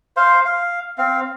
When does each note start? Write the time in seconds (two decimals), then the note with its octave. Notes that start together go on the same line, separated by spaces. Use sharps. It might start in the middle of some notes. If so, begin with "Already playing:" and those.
0.17 C5 F5 C6
0.45 F5
0.98 C4 F5